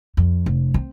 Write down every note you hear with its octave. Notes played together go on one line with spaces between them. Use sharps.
F2
F1
C4